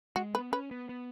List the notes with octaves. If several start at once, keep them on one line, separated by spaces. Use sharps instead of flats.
G#3 F#4
B3 B4
C#4 B4
B3
B3